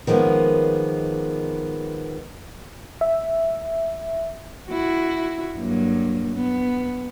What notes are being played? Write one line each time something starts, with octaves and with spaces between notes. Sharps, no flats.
D#3 F3 G#3 A#3 B3
E5
E4 F#4
G2 F#3 A#3
B3